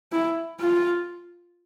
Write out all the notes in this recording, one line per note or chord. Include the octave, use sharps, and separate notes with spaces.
E4
F4